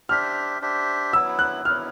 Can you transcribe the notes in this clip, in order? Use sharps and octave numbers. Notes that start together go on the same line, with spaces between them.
D4 G4 C5 E5 F6
D4 G4 C5 E5
F#3 B3 E4 E6
F#6
F#3 B3 E4 F6